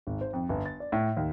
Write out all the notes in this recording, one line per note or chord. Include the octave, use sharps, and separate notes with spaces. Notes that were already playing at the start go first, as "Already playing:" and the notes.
G#1
C5
F2
G1
A6
D5
A2
D#2